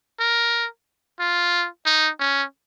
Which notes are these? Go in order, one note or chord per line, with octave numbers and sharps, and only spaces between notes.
A#4
F4
D#4
C#4